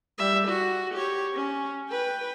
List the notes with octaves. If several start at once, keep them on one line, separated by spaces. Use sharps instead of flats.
G3 E5
F#4
G4 C#5
C#4
B4 G5